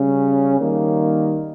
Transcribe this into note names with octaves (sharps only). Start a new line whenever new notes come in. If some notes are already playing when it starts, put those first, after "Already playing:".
Already playing: C#3 G3 C#4
D#3 G3 A#3